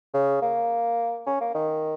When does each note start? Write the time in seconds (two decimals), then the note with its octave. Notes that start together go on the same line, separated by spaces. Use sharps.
0.14 C#3
0.42 A#3
1.27 C#4
1.41 A#3
1.55 D#3